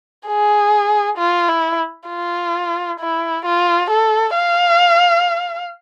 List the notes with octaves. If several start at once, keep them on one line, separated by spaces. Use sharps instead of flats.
G#4
F4
E4
F4
E4
F4
A4
F5